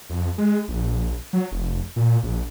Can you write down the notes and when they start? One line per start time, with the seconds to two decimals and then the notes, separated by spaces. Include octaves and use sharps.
0.10 F2
0.38 G#3
0.68 A#1
1.33 F#3
1.52 F1
1.96 A#2
2.23 A#1